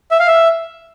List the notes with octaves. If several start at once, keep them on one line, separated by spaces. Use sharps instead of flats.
E5
F5
E5